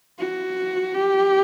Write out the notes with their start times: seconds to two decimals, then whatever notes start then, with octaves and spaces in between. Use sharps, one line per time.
0.20 F#4
0.94 G4